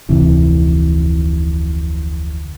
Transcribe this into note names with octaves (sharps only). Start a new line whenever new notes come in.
F1 D2 C3 E3